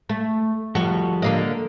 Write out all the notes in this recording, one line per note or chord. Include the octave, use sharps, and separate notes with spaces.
A3
F3 G3 F#4 A4
D3 A#3 D#5